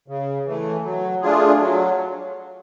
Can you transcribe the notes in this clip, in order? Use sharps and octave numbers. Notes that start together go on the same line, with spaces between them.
C#3
E3 A3
F#3
A3 D4 F4 G#4
F#3